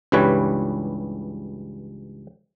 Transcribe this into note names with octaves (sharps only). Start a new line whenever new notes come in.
C#2 G2 E3 G3 B4 C#5